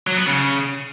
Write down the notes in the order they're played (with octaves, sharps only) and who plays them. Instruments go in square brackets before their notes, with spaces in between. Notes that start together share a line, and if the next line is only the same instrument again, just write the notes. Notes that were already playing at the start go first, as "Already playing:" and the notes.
[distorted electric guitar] F#3
B3
C#3